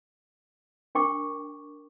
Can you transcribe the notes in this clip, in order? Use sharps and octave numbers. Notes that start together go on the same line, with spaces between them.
D4 A#4 G5 C#6 D6